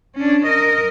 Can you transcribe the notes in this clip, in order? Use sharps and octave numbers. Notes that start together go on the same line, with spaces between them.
C#4 D4
A#4 D#5